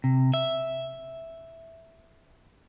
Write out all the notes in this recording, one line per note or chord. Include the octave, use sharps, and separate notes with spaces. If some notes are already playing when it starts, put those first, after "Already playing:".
C3
E5